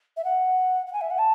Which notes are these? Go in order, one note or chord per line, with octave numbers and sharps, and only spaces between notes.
E5
F#5
F#5
G#5
E5
F#5
A5